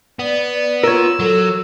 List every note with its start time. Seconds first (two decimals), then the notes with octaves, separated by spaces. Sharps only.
0.19 B3 D5
0.84 F4 A#4 C#5 E6
1.20 F#3 A4